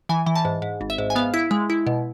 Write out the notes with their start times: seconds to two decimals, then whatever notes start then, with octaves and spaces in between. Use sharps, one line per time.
0.09 E3 G#5
0.26 E3
0.35 A5
0.45 G#2
0.62 G#2
0.81 G#1
0.90 E5
0.98 G#2
1.10 G#5
1.16 B3 F5
1.34 E4
1.51 G#3
1.70 E4
1.87 B2